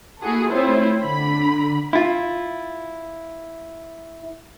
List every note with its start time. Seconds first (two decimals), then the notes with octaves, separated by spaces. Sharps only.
0.21 A#3 E4 F#4 G#4 A4
0.50 A3 C4 E4 F4 C5 C#5
1.01 D3 B5
1.93 E4 F4